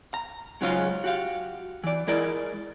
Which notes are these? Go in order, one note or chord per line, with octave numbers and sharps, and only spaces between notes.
A#5
G#2 C#3 F#3 G#3 C#4 F4
F#4 G4 F5
E3 D5
G#3 E4 A#4 D5 D#5